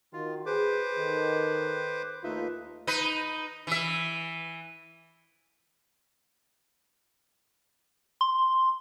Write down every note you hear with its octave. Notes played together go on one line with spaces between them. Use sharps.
D#3 F4 F#4
G#4 B4 C5 D6
D#3 A4
D#2 A3 D#4 F4 B4 E5
D#4 B4
E3 E5
C6